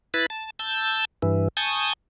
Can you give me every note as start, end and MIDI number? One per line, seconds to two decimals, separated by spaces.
0.14 0.26 64
0.14 0.26 71
0.14 0.26 83
0.14 0.26 93
0.30 0.50 81
0.59 1.05 81
0.59 1.05 88
0.59 1.05 91
1.22 1.48 43
1.22 1.48 52
1.57 1.93 80
1.57 1.93 81
1.57 1.93 85
1.57 1.93 87
1.57 1.93 91